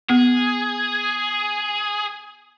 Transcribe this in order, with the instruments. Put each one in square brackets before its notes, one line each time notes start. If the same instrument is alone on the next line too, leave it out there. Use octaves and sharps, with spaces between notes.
[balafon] B3 [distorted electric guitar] G#4